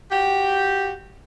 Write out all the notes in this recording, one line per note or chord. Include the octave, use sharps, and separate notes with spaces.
F#4 G4